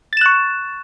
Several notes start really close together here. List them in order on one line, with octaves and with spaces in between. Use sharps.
A6 E7 F#6 C#6